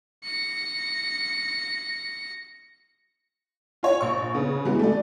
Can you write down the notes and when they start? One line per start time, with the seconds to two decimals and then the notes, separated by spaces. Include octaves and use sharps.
0.24 A#6 C#7
3.83 F4 C#5
4.01 A#1 C#6
4.35 C#3 B3
4.65 E3 G#3 B3
4.79 A3 D5